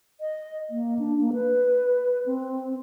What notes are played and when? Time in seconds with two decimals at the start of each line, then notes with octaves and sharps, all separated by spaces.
0.21 D#5
0.70 A#3
0.99 D4
1.21 A#3
1.33 B4
2.26 C4